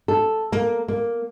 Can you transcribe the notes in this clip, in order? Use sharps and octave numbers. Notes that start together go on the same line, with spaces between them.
A4
A#3
A#3